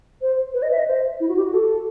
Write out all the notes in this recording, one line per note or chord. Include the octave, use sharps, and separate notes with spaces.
C5
B4
D#5
E5
D#5
C5
E4
F#4
G4
F#4
A4